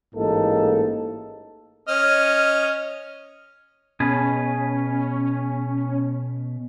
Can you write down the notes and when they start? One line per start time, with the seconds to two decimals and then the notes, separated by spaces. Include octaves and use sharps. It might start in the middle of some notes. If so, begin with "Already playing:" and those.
0.14 A1 G#2 A#3 D#4 A4
1.88 C#4 D#5 F6
4.00 B2 C#4 G#4 B4